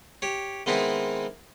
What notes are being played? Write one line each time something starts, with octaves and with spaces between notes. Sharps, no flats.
G4 C#5
D#3 G#3 B3 C4 D#4 E4